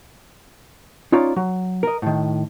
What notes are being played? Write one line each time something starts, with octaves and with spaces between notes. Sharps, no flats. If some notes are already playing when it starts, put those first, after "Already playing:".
C#4 D#4 F4 C#5 D5
F#3
A#4 D#5
A2 D#3